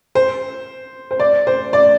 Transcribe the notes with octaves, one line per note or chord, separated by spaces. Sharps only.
C5
C5
D5
C5
D5